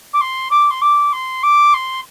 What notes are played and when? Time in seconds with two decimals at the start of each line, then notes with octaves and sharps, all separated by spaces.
0.13 D6
0.20 C6
0.50 D6
0.70 C6
0.81 D6
1.12 C6
1.42 D6
1.73 C6